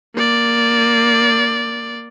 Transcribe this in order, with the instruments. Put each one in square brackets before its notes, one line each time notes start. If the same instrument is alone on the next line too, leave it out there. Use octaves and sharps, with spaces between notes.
[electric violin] A#3 D5